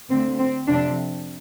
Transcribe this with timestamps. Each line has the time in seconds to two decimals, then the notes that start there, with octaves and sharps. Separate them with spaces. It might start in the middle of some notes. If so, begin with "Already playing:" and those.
0.10 D2 D3 C4
0.39 C4
0.67 F2 C3 D4